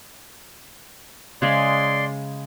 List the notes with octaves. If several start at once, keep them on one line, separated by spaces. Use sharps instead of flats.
C#3 G#3 G#4 D5 C6